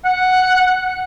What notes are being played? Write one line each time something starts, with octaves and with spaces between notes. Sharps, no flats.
F#5